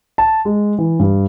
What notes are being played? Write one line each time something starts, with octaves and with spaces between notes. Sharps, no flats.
A5
G#3
E3
G2